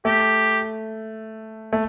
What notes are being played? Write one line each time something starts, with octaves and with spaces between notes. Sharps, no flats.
A3 G4
A3